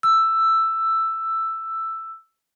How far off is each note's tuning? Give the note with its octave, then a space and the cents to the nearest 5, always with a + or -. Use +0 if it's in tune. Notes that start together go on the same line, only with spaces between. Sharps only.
E6 +5